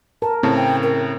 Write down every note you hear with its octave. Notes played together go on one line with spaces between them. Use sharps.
A#4 A5
A2 C#3 C4 A5
G5
A#4